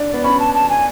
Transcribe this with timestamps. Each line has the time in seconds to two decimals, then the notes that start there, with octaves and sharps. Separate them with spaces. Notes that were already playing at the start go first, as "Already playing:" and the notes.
Already playing: D4
0.09 B3 D5
0.24 C#4 B5
0.40 A5
0.55 A5
0.69 G#5